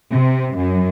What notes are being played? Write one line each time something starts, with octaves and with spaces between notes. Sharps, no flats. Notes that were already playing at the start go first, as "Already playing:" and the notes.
C3
F#2